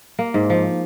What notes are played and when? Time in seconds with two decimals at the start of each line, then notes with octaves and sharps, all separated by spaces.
0.19 A#3
0.34 G#2
0.50 F3